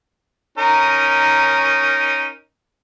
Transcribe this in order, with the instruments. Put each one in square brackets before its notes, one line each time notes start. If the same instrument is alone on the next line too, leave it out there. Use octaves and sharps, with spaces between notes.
[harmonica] C#4 D#4 A#4